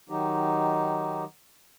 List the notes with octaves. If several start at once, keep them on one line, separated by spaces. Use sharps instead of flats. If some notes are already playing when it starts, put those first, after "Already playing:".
D#3 F#3 D#4 G4